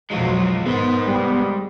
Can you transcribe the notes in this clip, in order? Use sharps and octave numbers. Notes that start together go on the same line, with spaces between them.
B1 F2 F3 F#3 G#3 F4
G#2 D#3 G#3 B3 C5
C2 G3